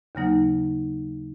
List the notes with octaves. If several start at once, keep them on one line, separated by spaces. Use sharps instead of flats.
D#2 C#3 F#3 A#3 D#4